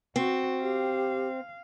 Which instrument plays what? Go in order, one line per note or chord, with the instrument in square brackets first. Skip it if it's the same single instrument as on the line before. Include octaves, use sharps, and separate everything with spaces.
[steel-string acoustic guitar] C4 [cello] F#4
[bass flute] G4 [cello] F5